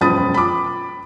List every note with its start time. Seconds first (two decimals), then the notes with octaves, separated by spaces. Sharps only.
0.01 E1 F#2 F3 B5 D#6 A6
0.34 B5 D6